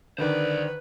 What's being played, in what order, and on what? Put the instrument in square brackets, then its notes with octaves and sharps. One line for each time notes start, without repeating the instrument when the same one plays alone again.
[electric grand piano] D3 D#3 [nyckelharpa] B4 [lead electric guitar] C5 D5